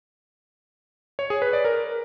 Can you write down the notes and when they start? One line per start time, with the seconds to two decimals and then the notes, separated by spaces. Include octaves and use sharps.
1.19 C#5
1.30 G#4
1.42 B4
1.53 D5
1.65 A#4